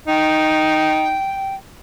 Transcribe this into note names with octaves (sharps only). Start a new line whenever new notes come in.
D#4 G5